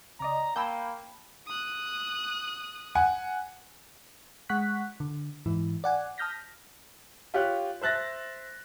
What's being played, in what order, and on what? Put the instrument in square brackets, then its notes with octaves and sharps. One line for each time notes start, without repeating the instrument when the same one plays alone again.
[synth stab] C#2 D5 D#5 [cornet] A#5
[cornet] A#3 [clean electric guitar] G5 A5 B5 [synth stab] E6 G6
[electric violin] D#6 F#6
[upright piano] F#5 G#5
[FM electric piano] G#3 F#5 C#6 F#6 B6
D3
G#2 E3 E4
D5 F#5 G#5
A5 D#6 F6 G6 A#6 B6
[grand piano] F4 G4 C#5 F#6
C5 E5 F#6 A6 A#6